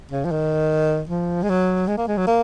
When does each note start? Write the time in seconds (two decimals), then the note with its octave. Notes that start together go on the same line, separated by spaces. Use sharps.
0.11 C#3
0.25 F3
0.32 D#3
1.09 F3
1.43 G#3
1.49 F#3
1.88 G#3
1.98 A#3
2.08 G#3
2.17 F#3
2.27 A#3